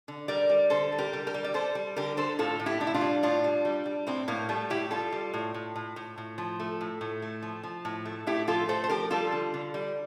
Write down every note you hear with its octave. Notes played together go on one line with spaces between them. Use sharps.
D3
G3 A#4 D5
G3
D3 A4 C5
G3
G4 A#4
G3
G4 A#4
G3
D5
G3 A4 C5
G3
D3 G4 A#4
D3 A4 C5
A2 F4 A4
A2
E4 G4
A2 D4
E4
D4 F4
G3
A2 D4 F4
G3
G3
G3
A2 C4 E4
A2 A#3
G3 A3
A2 E4 G4
G3 F4 A4
G3
A2
A2
A2
A2
A2
F3
A3
A2
A2
A3
F3
F3
A2
A3
A2 E4 G4
F3 F4 A4
A3 A4 C5
C5
F3 G4 A#4
G3 F4 A4
D3
D3
G3